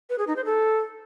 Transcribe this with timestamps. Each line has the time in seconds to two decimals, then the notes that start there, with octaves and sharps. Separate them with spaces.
0.10 B4
0.18 G#4
0.27 D#4
0.36 C5
0.45 A4